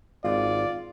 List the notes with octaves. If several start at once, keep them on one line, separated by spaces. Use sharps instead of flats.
G#1 F4 D5